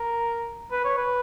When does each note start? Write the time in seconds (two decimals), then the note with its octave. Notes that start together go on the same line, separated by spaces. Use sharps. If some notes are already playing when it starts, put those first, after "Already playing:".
Already playing: A#4
0.72 B4
0.85 C#5
0.98 B4